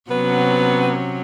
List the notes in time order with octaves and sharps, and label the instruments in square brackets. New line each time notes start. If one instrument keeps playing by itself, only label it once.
[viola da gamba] C3 F#3 C#4 [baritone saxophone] B3